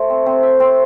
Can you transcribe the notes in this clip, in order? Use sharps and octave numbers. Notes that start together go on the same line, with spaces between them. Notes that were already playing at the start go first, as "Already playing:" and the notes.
Already playing: A3 C5
C4
C4
E5
C4